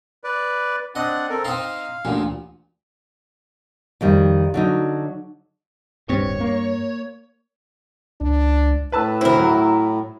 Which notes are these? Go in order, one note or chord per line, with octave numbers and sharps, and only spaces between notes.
B4 D5
C4 D4 D#5 F#5
C4 A4 A#4
C4 D#4 F5
A1 D2 A#2
F2 D#3 G3
D3 F#3 D#4
D1 G2 C4 C#5
A#3
C#2 D4
A2 B4 A5 E6
D2 C4 E4 A#4
F#3